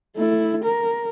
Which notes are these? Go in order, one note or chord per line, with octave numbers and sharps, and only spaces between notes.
A3 E4
A#4